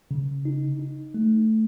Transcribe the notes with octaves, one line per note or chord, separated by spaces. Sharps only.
C#3
D#4
D#4
A3